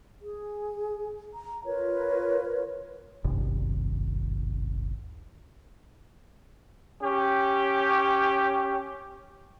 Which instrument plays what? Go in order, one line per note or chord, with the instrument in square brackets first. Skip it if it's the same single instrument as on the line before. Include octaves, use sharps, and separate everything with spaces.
[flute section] G#4
A#5
F4 A#4 B4 C#5
[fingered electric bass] D#1 G#1 G2 C3
[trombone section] C#4 G4